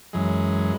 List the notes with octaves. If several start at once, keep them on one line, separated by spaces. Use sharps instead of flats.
F#2 E3 G#3